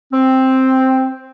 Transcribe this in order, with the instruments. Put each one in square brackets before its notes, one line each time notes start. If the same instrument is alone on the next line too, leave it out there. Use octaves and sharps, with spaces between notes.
[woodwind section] C4